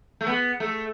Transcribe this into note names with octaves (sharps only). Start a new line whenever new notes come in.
A3
B3
A3